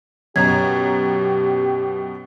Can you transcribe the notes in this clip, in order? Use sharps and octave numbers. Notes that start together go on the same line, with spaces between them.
F#2 B2 G4 A#5 G#6